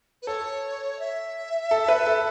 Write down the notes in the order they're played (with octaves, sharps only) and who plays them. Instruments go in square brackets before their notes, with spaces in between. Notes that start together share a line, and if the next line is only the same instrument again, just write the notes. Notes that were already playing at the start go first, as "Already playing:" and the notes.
[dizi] B4
[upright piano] A4 [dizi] C#5
[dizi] E5
[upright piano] A4
B4
A4